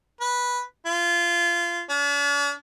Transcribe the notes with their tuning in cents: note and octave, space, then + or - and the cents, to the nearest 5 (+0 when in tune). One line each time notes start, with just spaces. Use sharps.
B4 -10
F4 -20
D4 -45